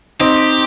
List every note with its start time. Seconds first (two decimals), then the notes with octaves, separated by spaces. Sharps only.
0.20 C4 D#4 G4